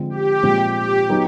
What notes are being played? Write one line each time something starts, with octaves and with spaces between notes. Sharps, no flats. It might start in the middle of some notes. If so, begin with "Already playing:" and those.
Already playing: D3 F3 G#3 C4
G4
A#2 F3 G#3 C4
G4
F#3 B3 D#4